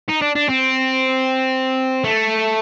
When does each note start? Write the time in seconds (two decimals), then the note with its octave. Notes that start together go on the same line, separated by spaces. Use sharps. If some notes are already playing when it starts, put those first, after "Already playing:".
0.09 D#4
0.22 D4
0.35 D4
0.49 C4
2.04 A3